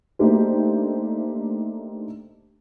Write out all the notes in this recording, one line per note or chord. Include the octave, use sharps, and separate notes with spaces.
A3 A#3 D4 D#4 G4 C5